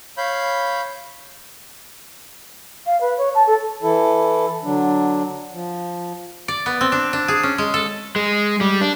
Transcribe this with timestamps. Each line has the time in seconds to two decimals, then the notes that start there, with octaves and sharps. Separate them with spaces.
0.18 C#5 F5 B5 G6
2.86 F5
3.01 B4
3.18 C#5
3.35 A5
3.47 A4
3.83 E3 E4 A4
4.63 D3 F#3 D4
5.53 F3
6.48 D5
6.66 B3
6.81 C4
6.92 D4
7.13 D4
7.28 G#4
7.43 C#4
7.58 G#3
7.74 A4
8.16 G#3
8.61 G3
8.81 D4